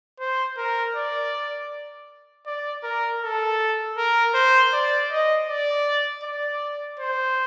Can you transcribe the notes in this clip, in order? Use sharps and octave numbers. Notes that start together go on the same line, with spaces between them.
C5
A#4
D5
D5
A#4
A4
A#4
C5
D5
D#5
D5
D5
C5